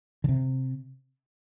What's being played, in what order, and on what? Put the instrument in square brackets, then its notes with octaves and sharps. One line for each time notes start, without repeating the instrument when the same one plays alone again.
[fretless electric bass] D3
C3